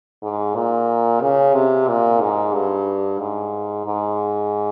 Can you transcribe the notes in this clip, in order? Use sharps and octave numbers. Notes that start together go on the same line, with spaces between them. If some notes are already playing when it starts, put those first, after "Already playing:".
G#2
A#2
C#3
C3
A#2
G#2
G2
G#2
G#2